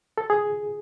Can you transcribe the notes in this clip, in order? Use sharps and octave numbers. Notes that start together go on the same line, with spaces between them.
A4
G#4